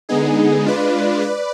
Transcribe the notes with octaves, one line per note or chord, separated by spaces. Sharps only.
D3 G#3 B3 D#4 G#4
G#3 D4 F4 B4 D5
B4 D5